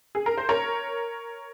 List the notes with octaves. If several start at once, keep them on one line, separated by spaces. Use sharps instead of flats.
G#4
A#4
C5
A#4 C#5